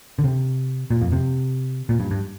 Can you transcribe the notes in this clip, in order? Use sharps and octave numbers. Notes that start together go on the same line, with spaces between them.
D3
C3
A#2
F2
C3
A#2
G2
G2